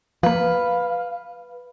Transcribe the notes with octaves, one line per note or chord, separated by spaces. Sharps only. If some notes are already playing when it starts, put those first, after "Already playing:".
F3 A#3 B4 F5